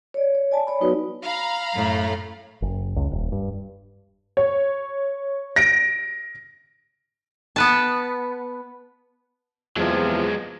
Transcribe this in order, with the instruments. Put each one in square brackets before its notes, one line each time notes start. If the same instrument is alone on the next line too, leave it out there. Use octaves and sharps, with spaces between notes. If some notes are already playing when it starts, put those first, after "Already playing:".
[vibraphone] C#5 D5
C#5
D5 G#5 A5
C#5 D5 B5
F#3 B3 D#4 F#4 B4 D#6
[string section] F5 A#5 B5
[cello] F#2 A2
[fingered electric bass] F#1
C#2
D#1
G2
[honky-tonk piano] C#5
A#6 D7
[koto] B3 B4 A5
[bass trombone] E2 [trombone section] C3 F3 [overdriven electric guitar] F#3 G#3